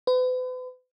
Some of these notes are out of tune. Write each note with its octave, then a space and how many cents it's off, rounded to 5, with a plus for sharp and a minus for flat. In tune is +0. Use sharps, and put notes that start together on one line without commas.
B4 +40